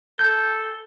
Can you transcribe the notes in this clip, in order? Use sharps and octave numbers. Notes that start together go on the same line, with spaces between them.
A4 G6